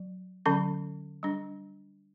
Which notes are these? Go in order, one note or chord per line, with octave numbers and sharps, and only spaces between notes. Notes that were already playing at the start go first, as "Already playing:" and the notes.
Already playing: F#3
D3 F#3 C#4 B5
G3 D4